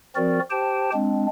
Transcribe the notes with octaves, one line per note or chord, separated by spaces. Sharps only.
F3 C4 F#4 A#4 D5
G4 C5 G5 A5
G#3 C4 D4